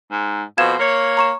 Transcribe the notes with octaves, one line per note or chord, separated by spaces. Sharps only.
G#2
F2 B2 C5 F5 G#6 E7
A#3 C#5
A#5 C#6 E7